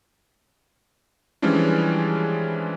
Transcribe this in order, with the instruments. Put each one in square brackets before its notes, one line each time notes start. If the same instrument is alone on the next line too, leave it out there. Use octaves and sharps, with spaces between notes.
[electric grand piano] E3 F3 G3 G#3 C#4 D4